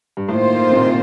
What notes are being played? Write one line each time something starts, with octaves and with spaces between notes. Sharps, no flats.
G2
A2 D#3 A#3 F4 C5
C3
A#2